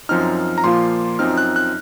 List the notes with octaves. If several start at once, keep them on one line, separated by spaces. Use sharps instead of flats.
F#2 F3 C4 D#4 F6
A#5
A#2 F3 A#3 F4 C6
F#2 F3 C4 D#4 F6
F#6
F#6